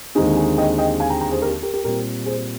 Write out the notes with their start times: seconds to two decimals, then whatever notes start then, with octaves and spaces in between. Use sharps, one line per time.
0.15 D#2 D3 G#3 C4 D#4 G#4
0.37 G#4
0.58 D#5 G5
0.78 D#5 G5
1.00 F5 G#5
1.10 G5 A#5
1.21 G5 A#5
1.31 G#4 C5
1.41 G4 A#4
1.62 G4 A#4
1.73 G4 A#4
1.84 A#2 G3 C4 G4 A#4
2.25 G#4 C5